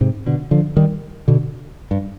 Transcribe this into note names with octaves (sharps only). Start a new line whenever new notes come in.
G#2 C3
B2 D3
D3 F3
D#3 G3
B2 D3
G2